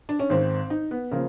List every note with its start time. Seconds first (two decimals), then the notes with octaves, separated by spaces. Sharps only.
0.09 D4
0.19 C#4
0.30 G#1 G#2 D#3 C4
0.70 D#4
0.91 B3
1.11 C#3 F3 A#3